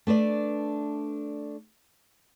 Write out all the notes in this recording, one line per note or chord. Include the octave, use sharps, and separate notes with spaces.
A3 D4 B4 D5